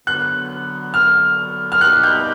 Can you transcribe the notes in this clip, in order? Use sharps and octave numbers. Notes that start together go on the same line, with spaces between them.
D3 F#3 B3 F#6
F6
F6
B2 G3 B3 D#4 G4 F#6
G6